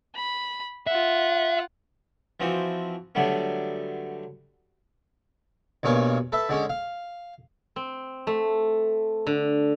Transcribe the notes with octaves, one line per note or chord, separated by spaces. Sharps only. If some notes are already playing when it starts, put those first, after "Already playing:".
B5
F4 E5 F#5
E3 F3 C4 F#4
D3 F#3 G3 A3 B3
B1 G2 A#3 C#5 G#5 D#6
A4 B4 E5
D3 G#3 C#4
F5
C4
A3
D3